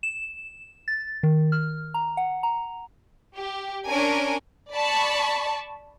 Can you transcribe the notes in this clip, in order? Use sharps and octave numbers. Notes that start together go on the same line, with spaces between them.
E7
A6
D#3
F6
A#5
F#5
A#5
G4
C#4 D4 A#4 G#5 D7
D5 A5 B5 C#6